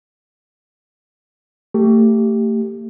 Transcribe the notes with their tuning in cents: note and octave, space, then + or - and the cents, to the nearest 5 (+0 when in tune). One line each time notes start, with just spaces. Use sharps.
A3 +30 G4 +0